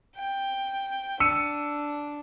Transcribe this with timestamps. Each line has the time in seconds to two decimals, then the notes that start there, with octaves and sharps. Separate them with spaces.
0.17 G5
1.20 D4 E6 C#7 D#7